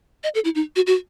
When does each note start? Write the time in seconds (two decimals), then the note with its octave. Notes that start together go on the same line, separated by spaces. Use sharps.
0.24 D#5
0.35 A4
0.45 E4
0.55 D#4
0.76 F#4
0.87 F#4